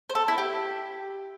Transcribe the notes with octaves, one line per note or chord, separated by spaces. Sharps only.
C5
A4
E4
G4